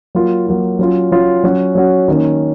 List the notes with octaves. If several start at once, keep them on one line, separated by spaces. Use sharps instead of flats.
F#3 A#3 F4
F#3 A#3 F4
F#3 C#4 F4
F#3 C#4 F4
F#3 C#4 F#4
F#3 C#4 F#4
D#3 A#3 C#4